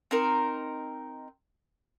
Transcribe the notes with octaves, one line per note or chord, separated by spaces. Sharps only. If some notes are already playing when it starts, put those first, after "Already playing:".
C4 D#4 A#4